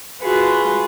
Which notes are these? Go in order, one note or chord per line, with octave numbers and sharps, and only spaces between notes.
F4 F#4 G#4 B4